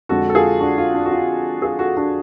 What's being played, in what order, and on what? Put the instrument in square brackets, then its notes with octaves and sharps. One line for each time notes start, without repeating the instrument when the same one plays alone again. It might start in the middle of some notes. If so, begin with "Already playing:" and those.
[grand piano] F2 D3 G#3 F#4 A4
A4
F4 G#4
D4 F#4
F4
D4
F#4
F4
F4 G#4
F#4 A4
D4 F#4